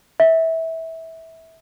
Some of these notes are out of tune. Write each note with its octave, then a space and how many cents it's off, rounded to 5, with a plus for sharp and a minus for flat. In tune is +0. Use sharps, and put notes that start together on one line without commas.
E5 -20